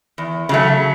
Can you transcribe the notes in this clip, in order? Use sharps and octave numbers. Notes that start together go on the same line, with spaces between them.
E2
C#3 F#3 A3